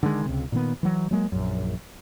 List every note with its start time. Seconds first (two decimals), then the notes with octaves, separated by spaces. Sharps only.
0.03 D3 D#3 F3 G#3
0.25 C#2 C3
0.52 A#2 D#3 B3
0.83 E3 F#3
1.11 F#3 G#3 A#3
1.32 A#1 F#2